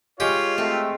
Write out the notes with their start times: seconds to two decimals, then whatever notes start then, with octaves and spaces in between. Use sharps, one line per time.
0.20 G#3 F4 G4 C#5
0.58 A3 C4